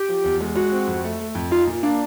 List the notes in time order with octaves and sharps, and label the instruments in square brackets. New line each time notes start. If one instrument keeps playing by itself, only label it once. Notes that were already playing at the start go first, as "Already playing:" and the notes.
Already playing: [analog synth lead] G4
[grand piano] F3
E2
G#3
[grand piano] G#3 [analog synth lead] F#4
[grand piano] C4
F2
A3
A3
F2
[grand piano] D#4 [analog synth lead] F4
[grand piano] A#2
[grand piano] A#3 [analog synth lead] D4